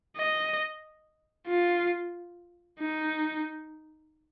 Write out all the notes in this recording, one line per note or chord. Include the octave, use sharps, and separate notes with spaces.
D#5
F4
D#4